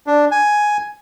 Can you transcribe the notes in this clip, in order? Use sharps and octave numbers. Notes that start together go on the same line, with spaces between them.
D4
G#5